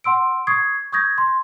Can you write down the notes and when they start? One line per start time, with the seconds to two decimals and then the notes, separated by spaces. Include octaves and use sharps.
0.04 F#5 C6 E6 D7
0.47 C#6 D#6 G#6 C7
0.92 C#6 D#6 G6 G#6 A#6
1.18 C6